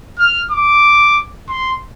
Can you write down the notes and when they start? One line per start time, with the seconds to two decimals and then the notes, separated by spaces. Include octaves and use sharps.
0.19 F6
0.51 D6
1.49 C6